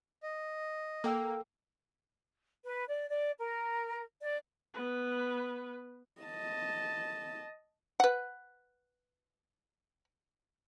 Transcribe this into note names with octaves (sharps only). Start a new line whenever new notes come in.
D#5
A#3 A4 G5 E6
B4
D5
D5
A#4
D5
B3 B4
D#5 A5
B4 F#5